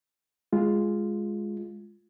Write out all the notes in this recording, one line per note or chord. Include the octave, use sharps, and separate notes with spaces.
G#3 F4